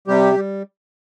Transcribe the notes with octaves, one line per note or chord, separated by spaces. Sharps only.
C3 G3 G4
G3